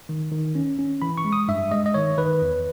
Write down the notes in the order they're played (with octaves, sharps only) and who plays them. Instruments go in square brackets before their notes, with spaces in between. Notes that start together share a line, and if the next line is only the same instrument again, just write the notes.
[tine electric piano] D#3
D#3
C#4
C#4
E3 B5
C#6
G#3
D#6
G2 E5
G#3 D#5
D#5
D#3 C#5
D#3 B4
E2